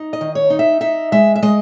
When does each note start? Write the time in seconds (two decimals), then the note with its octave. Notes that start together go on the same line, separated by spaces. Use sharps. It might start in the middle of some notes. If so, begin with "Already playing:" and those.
Already playing: D#4
0.13 D#5
0.21 D#3
0.35 C#5
0.50 D#4
0.59 E5
0.81 D#4 E5
1.12 G#3 E5
1.36 E5
1.42 G#3 D#5